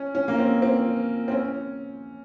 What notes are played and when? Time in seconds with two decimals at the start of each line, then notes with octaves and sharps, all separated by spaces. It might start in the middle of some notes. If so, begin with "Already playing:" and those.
Already playing: C#4
0.15 C#4
0.28 A#3
0.38 C4
0.62 C4
1.28 C4
1.32 C#4